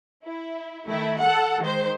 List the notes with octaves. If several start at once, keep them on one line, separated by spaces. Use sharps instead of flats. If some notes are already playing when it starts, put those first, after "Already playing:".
E4
D#3 A3 E4
A4 F#5
D#3 G#3 C5